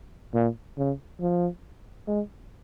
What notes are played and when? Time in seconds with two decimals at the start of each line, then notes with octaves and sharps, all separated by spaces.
0.34 A#2
0.78 C#3
1.21 F3
2.07 G#3